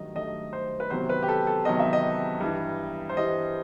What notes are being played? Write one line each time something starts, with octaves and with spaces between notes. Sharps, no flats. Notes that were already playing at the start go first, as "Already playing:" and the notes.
Already playing: G2 D#3 F#3 A3 D#5
G2 D#3 F#3 A3 D#5
C5
B4
E2 C3 D#3 F#3 C5
B4
G4
A4
A4
E2 C3 D#3 F#3 D#5
E5
D#5
G2 E3 G3
C5
G2 E3 G3 D#5